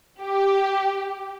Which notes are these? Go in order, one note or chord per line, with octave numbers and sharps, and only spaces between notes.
G4